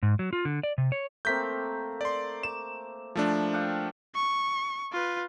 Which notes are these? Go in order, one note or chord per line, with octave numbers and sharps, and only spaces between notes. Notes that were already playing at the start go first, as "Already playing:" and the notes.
G#2
F#3
F4
D3
D5
C3
C#5
A3 A#3 C4 G6 B6
D5 C6
D6 E7
F3 A3 D4
G4 F5 F#5
C#6
F4 B4